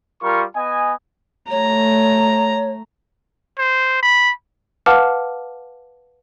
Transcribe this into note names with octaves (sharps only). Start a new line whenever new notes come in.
G3 F4 A#4 C#6
B3 D#5 G#5
A3 C#5 A#5
C5
B5
B4 F5 F#5 A5 D6 F6